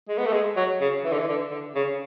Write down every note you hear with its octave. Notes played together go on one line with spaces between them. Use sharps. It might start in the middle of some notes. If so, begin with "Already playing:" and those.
G#3
B3
A3
G#3
F#3
C#3
E3
D3
E3
D3
D3
C#3